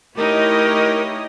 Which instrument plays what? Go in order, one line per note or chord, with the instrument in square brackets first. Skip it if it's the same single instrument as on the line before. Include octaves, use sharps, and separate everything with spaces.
[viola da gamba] A3 D#4 G4 [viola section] E4 C#5 D#5 [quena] A#4